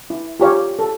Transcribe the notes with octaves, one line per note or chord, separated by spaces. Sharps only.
E4
F4 G4 C#5 F5
A4